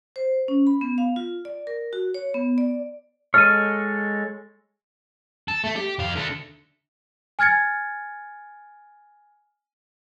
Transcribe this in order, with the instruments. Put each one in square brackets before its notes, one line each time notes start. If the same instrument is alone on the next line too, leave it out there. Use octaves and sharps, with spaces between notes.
[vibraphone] C5
C#4
B5
B3
F5
F4
D5
A#4
F#4
C#5
B3
D5
[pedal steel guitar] G#3 A4 C#5 [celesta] F6 D#7
[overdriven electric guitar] A4
A3
G4
F2 F5
D3 A3
[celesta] G#5 F6 G#6 A6 C#7